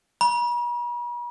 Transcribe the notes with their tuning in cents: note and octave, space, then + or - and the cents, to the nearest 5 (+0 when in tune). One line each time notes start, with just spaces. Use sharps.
B5 -45